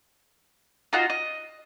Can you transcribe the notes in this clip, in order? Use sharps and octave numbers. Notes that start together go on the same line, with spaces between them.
D#4 F4 F#4
D#5